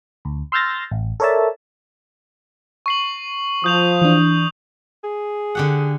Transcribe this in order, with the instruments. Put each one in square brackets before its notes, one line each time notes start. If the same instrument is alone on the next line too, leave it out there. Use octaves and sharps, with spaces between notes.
[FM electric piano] D2
C6 E6 F6 G6 A6 A#6
A1
A4 A#4 C#5 D5 E5 A5
[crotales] C#6 C7 F#7
[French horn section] F3 [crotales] D#6 G6 F7
[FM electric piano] E3 D4
[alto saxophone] G#4
[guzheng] D3 G4 F#5